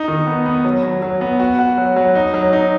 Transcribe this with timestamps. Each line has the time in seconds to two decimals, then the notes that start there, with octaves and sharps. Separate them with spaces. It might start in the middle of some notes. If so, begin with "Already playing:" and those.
Already playing: D#4
0.08 D#3
0.27 B3
0.46 B3
0.65 F#3
0.83 F#3
1.02 F#3
1.21 B3
1.40 F#4
1.59 F#4
1.78 F#3
1.96 F#3
2.15 D#4
2.34 F#3
2.53 D#4